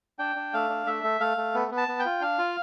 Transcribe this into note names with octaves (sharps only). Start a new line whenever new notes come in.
D4 G5
D4
A3 F5
D4
A3 E5
A3
A3 F5
A3
B3
B3
A5
B3
G5
F4
D4 F5
F4